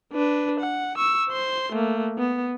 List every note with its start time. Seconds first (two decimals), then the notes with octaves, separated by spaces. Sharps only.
0.13 D4 B4
0.60 F#5
0.98 C#6 E6
1.30 C5 C6
1.73 A3 A#3
2.18 B3